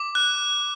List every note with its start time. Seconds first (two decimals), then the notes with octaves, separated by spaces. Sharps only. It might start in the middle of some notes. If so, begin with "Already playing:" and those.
Already playing: D6
0.15 F#6